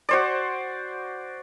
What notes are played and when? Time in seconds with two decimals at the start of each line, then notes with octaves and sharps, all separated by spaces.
0.09 F#4 C5 D5